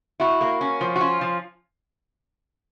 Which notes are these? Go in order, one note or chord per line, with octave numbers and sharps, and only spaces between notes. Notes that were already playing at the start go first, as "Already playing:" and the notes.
E4 F#4
A#3
C#4
F3
F#4
C#4 F4
F3